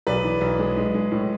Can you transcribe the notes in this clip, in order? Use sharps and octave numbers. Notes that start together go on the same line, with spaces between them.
B1 B4 D5
E3
B1
G#3
G#3
G#3
A2